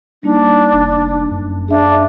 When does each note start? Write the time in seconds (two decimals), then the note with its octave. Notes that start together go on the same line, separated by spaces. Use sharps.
0.23 G3 A#3 D4 D#4
0.72 F1
1.30 F#2
1.68 D4 G#4 E5 F5